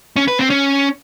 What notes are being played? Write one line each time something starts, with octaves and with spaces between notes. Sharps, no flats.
C#4
B4
C4
C#4